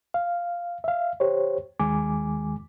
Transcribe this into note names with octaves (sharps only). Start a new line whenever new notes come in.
F5
E5 F5
G4 C5 C#5
D#2 D#3 G#3 G#5 D6